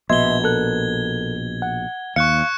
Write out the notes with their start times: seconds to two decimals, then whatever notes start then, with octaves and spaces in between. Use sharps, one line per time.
0.10 A#1 B2 D#5 E5 C6 G#6 G7
0.44 A4 A#4 F#6
1.62 F#5
2.16 D#2 F5 C#6 F#6 C#7